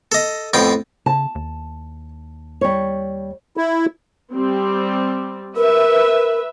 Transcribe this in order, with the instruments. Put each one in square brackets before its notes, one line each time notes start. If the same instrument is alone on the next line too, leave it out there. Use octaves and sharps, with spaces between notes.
[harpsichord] A4 D#5
F2 A2 B3 G5
[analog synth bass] C#3 [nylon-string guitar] A5
[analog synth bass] D#2
[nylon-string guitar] G3 C#5
[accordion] E4
[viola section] G3 C4
[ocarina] A#4 [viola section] B4 E5